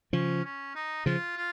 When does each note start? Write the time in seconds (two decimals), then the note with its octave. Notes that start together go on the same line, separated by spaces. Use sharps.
0.13 C#3 F3 C#4
0.45 C#4
0.75 D#4
1.06 C#3 F3 F4
1.37 F4